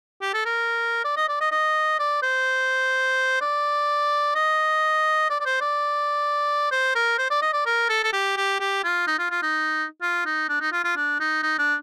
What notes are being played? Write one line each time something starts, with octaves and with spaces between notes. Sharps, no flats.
G4
A4
A#4
D5
D#5
D5
D#5
D#5
D5
C5
D5
D#5
D5
D5
C5
D5
C5
A#4
C5
D5
D#5
D5
A#4
A4
A4
G4
G4
G4
F4
D#4
F4
F4
D#4
F4
D#4
D4
D#4
F4
F4
D4
D#4
D#4
D4